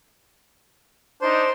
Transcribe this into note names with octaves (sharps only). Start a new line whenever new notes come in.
D4 D#4 C5